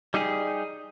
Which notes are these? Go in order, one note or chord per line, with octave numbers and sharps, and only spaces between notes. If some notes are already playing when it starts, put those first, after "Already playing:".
G3 D#4 G4 G#4